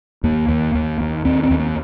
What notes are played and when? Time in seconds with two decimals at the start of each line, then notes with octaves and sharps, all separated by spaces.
0.23 D#2 A#3
0.48 D#2
0.75 D#2
1.01 D#2
1.25 D#2 C4
1.43 C4
1.51 D#2
1.60 A#3